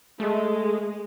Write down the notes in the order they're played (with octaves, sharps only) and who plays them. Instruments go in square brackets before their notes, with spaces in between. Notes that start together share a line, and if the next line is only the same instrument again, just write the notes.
[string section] G#3 [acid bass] A3